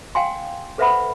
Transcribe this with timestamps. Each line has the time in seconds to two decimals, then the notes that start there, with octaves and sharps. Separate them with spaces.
0.15 F5 G5 G#5 C6
0.78 A4 B4 C5 E5 F#5 B5